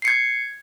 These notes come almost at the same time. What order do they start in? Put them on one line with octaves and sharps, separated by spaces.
C7 C#7 G#6